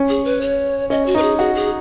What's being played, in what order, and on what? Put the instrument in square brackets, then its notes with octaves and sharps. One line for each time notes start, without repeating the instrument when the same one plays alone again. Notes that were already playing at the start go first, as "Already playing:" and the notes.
Already playing: [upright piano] C#4
[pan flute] G#4
B4
C#5
[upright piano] C#4 [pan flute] D#5
[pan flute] F#4
[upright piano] D#4 [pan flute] B4
[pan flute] G#4
[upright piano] F#4 [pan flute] G#4
[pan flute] G#4